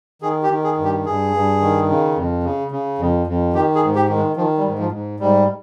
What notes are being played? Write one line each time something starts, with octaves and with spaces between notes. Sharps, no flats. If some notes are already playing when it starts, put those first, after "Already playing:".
D#3 G#4
G4
D#3
G#4
G2
G4
G2 G#4
G2
D#3
C#3
F2
C#3
C#3
F2
F2
D#3 G4
G#4
G#2
G4
D#3
G#3
D#3 F3
G3
G#2
F3
G#2
G#2 G3